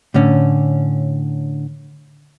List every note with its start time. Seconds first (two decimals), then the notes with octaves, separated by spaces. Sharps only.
0.14 A2 D3 C#4